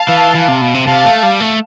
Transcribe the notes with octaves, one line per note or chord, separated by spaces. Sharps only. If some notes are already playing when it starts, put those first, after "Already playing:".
Already playing: F5 A5
E3
E3
C3
B2
C3
C3 F5 A5
A3
G3
A3